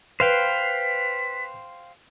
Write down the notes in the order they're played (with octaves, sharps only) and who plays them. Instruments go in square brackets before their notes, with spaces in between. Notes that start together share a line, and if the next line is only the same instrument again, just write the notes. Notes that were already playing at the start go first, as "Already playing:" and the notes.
[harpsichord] B4 [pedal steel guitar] C5 F5 G5 [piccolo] B6